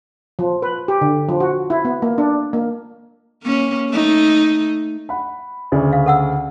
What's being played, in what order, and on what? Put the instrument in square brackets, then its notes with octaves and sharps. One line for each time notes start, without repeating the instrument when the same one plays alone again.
[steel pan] F3
B4
G4
D3
F3
F#4
E4
B3
A#3
D4
A#3
[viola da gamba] A#3 C#4
A3 D#4
[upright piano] F#5 B5
D2 C#3 D5
[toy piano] F5
A4 F#5 E6